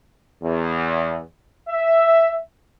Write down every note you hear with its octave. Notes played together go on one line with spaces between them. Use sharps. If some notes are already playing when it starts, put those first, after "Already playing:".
E2
E5